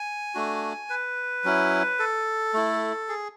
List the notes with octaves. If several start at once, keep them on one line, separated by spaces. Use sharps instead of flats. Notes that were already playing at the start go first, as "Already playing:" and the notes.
Already playing: G#5
A3 D4 F#4
B4
F#3 C#4 E4
A4
A3 E4
G#4